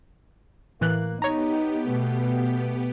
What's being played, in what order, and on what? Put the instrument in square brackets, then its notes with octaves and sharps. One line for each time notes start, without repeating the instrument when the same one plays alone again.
[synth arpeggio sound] A2 E3 F#6 [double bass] A#3
[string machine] B3 G4 [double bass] D#4 [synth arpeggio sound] C#5 A#5
[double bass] B2 A3